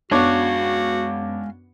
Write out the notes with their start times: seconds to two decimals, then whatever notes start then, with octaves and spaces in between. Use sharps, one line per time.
0.11 F#2 G#3 B3 D4 F#4 C#5 F5